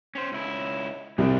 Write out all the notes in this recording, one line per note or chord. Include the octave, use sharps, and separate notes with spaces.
C#4 C5
C#2 E4
C2 G#2 D4